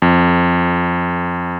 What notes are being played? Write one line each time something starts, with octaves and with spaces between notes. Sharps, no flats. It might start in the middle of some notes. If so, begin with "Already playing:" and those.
F2